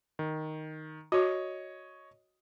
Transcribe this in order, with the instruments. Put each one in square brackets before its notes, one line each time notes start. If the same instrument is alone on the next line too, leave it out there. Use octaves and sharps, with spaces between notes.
[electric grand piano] D#3
[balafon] F#4 [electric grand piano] C#5 D#5